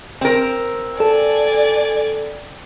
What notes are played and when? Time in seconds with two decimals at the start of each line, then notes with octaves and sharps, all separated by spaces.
0.21 C4 A#4
1.00 A4 D5 G#5